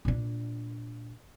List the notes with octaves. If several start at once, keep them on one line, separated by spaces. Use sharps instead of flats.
A#2 D4